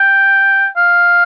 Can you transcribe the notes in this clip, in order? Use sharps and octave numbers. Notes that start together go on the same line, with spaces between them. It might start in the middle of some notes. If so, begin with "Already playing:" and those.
Already playing: G5
F5